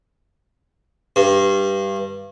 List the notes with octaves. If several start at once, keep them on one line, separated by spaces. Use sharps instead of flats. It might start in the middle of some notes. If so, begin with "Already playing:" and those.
G2